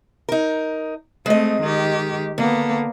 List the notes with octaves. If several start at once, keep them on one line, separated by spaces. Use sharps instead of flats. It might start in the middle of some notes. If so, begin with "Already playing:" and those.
D#4 A#4
G#3 A3 C4 D#5
D#3 G4
D3 A#3 B3